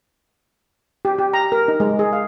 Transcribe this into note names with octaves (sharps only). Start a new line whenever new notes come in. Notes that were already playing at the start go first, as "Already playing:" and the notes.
G4
G4
A#5
A#4
D#4
G#3
G#4
F5